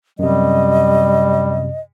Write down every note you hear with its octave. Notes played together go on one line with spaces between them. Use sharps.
F#2 C3 G3 D#5